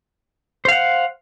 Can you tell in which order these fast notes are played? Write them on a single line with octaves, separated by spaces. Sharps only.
C5 F5 F#5